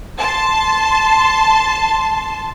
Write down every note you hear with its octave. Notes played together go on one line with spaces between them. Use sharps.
A5 C6